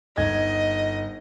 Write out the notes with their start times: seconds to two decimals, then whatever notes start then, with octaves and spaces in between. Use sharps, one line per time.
0.17 G1 D#4 D#5 G#6